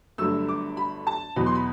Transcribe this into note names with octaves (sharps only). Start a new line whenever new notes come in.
G1 G2 F#3 A3 E6
D6
B5
A5
E2 B2 F#3 B5
C6
B5